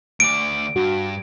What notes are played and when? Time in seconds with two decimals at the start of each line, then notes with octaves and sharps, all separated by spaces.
0.20 D2 D5 D7
0.76 G2 F#4